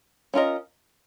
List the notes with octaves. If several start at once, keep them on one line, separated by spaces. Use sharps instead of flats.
C#4 F4 A#4 D#5